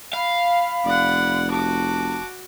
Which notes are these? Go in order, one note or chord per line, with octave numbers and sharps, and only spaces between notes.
F5 B5
F1 D5 F#5
F#4 A5 D6